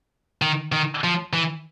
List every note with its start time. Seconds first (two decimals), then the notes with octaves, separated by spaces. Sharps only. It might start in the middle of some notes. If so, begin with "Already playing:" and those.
0.42 D#3
0.72 D#3
1.04 F3
1.33 E3